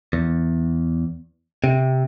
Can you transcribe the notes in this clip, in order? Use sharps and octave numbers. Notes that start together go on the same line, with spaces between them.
E2
C3